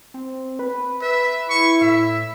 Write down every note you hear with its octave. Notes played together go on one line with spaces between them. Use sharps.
C4
B4
B4 E5
E4 C#6
A2 E5